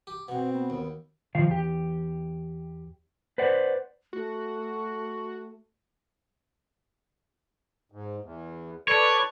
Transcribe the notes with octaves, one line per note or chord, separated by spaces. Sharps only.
G4
B2 C4 F#5
B3
D#2
D#3 F3 F5
E2 G4
B4 C5 D5 F#5
A3 F#4
G#2
E2
A4 B4 C#5 D5